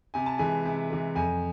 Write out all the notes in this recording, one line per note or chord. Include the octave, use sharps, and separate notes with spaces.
C3 G#5
A5
E3 G#3 G#5
C3
E3 G#3
F2 G#5